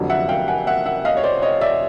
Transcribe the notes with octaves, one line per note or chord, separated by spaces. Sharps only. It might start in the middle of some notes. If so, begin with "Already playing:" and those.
Already playing: F1 F2 D3 F#3
E5 F#5
F5 G5
F#5 G#5
E5 F#5
E5 F#5
D#5 F5
C#5
C5 D5
C#5 D#5
D5 E5